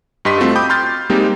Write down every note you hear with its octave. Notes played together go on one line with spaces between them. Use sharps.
G2 G4 D#5 C6 B6
A3 C4 F4 F#4 A4
G5 B5 D6 D#6 G6
B5 C6 F6 G6 A6
G3 G#3 A#3 C4 D#4 G4